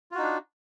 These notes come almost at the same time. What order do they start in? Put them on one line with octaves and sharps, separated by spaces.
F4 F#4 D#4 D4